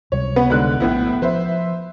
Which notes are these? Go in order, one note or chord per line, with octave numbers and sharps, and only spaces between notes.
C#2 C3 G3 C#5
B3 B4
G#2 D3 F#6
A#1 A2 B3 E4
F3 B4 C5 E5